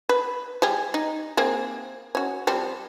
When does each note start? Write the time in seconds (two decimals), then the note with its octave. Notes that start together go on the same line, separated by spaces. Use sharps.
0.09 B4
0.62 G3 G4 G#4
0.94 D#4
1.37 A#3 C4 G#4
2.15 C#4 F#4
2.47 F3 G3 C4